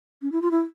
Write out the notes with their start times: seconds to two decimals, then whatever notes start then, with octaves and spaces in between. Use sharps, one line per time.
0.22 C#4
0.32 E4
0.42 F4
0.51 E4